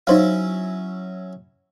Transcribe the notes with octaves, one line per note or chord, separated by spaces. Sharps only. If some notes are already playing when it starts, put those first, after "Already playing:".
F#3 C#4 D#4 E4 C5 F5